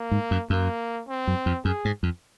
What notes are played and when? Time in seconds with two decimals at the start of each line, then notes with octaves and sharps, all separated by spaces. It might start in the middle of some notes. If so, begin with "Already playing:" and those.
Already playing: A#3
0.11 G#2
0.31 F#2
0.50 F#2 A#3
1.08 C4
1.27 F#2
1.46 F2
1.65 F#2 G#4
1.85 G#2
2.03 F2